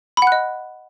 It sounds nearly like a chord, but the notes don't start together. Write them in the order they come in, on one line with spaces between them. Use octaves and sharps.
B5 F#5 F#6 D#5